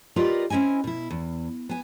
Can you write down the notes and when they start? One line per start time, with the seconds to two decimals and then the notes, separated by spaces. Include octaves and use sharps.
0.16 F4 G4 A#4 B4 D5 D#5
0.50 C4 C#4 E4 D#5 G#5
0.84 B2 E4
1.10 E2
1.69 B3 G#5